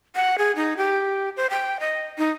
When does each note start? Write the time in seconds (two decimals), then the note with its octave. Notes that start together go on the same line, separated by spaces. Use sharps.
0.15 F#5
0.38 G#4
0.56 D#4
0.77 G4
1.37 C5
1.50 G5
1.80 D#5
2.18 D#4